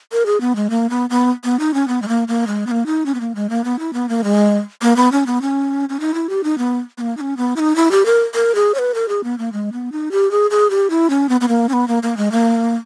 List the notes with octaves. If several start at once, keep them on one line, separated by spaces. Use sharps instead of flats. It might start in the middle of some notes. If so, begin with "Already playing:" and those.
A#4
G#4
B3
G#3
A#3
B3
B3
B3
D#4
C#4
B3
G#3
A#3
A#3
G#3
B3
A#3
D#4
C#4
B3
A#3
G#3
A#3
B3
E4
B3
A#3
G#3
A#3
B3
C#4
B3
C#4
C#4
D#4
E4
G4
D#4
B3
B3
A#3
D#4
C#4
B3
E4
D#4
E4
G4
A#4
A#4
G#4
C#5
B4
A#4
G#4
B3
A#3
G#3
B3
D#4
G4
G#4
G#4
G4
E4
C#4
B3
B3
A#3
C#4
B3
A#3
A#3
G#3
A#3